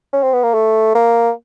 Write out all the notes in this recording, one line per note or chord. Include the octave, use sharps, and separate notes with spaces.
C#4
C4
B3
A#3
A3
A#3